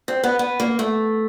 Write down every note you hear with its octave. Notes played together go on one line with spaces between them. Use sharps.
C4
B3
B3
A#3
A3